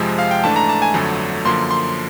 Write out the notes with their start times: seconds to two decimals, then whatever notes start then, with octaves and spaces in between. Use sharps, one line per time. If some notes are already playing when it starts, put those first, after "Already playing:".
Already playing: F2 C3 F3 G#3
0.19 F5
0.31 G5
0.44 G#2 E3 A3 D4 A5
0.56 A#5
0.69 A5
0.82 G#5
0.94 G1 F2 D3 F#3 A3
1.45 F#2 D3 F3 A#3 C6
1.71 C6